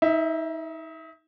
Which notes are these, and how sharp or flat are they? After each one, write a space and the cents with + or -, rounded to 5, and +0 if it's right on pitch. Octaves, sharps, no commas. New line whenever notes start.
D#4 +35 E5 +0